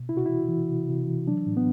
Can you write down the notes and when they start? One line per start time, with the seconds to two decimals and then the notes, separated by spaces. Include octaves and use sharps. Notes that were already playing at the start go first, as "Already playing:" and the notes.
Already playing: B2
0.09 C3 E4
0.17 F#4
0.26 E3 E4
0.48 E3
0.69 C3
0.88 C3
1.08 E3
1.27 F#3 D4
1.46 A2
1.57 B3